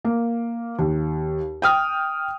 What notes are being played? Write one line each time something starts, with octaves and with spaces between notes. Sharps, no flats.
A#3
D#2
G5 D#6 F6